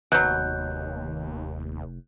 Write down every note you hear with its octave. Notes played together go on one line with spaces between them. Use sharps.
F1 D#2 B2 F#3 F#6 G6